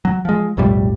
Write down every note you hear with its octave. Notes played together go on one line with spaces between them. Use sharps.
F#3
F3 G#3
B1 F2 A2 G3